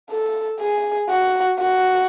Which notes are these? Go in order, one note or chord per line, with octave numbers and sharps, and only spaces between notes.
A4
G#4
F#4
F#4